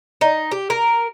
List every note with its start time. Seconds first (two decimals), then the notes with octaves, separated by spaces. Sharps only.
0.21 D#4
0.51 G4
0.70 A#4